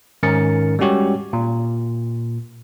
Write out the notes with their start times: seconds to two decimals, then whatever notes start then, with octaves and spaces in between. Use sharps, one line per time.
0.23 G#2 D#3 C#4 A#4 A6 C#7
0.79 G3 G#3 C#4 F#4 G4 C#5
1.33 A#2